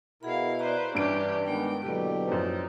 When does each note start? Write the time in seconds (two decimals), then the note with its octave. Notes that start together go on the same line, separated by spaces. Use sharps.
0.23 B2 E4 G#4 A#4 F5 F#5 B5
0.59 B4 C5 D5 A#5
0.95 G2 E3 C#4 D4 G4 D7
1.46 D#3 G#3 B3 D4 G5
1.82 B2 D3 F#3 A#3 E4 G4 B4
2.28 F#2 F3 D#4 D5